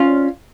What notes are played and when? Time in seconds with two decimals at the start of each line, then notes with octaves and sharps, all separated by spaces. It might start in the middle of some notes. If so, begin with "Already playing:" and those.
Already playing: C#4 F4